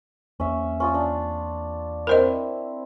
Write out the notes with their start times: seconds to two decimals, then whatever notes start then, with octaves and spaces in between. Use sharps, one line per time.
0.40 E2 A#3 C#4 E5
0.80 C#4 F4 D#6
0.94 D4
2.07 C4 E4 A#4 C5 D#5